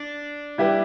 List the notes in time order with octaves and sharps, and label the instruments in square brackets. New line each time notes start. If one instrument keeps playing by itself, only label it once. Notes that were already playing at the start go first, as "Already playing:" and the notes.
Already playing: [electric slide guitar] D4
[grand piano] G3 E4 G4 B4